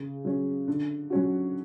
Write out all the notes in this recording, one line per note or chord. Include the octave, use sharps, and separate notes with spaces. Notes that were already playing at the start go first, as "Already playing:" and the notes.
Already playing: C#3
F#3 C#4
D3
F#3 C#4 F#4